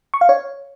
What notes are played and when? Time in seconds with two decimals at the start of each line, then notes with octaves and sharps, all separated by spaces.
0.14 C#6
0.21 F5
0.29 C#5